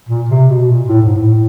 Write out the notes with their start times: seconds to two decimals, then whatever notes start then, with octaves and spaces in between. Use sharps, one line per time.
0.09 A#2
0.29 C3
0.49 B2
0.68 A#2
0.88 A2
1.02 G#2
1.16 A2